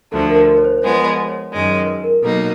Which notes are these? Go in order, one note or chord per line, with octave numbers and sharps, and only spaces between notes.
D2 D3 F3 A3 A4
A#4
A#4
C#5
C5
C5
F3 G#3 B3 C#5
D5
C#5
F#2 D#3 G#3 D5
C#5
B4
A#4
B2 F#3 A#3 D#4 A4